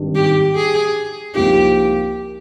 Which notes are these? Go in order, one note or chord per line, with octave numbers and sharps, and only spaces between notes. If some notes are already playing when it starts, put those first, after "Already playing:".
Already playing: G#1 G2 D#3 G3
G4
G#4
C2 C3 F3 A#3 D#4 G4